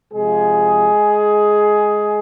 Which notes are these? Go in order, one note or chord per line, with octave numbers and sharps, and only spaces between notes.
C3 F3 G#3 G#4